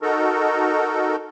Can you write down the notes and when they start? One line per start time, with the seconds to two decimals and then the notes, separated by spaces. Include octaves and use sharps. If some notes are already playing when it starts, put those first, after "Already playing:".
0.02 D#4 F#4 A4 A#4